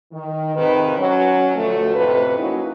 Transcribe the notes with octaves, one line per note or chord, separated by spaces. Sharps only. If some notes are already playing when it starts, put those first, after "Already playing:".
D#3
F2 G#2 C3 D#3 B4
F#3 C#4
D2 B2 F3 A3
F2 A2 C3 B4
F#3 A#3 C#4 D#4 E4